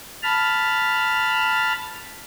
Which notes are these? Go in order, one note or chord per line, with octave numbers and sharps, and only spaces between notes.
A5 B5 F6